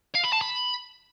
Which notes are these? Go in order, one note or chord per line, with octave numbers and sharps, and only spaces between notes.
F5
B5
A5
B5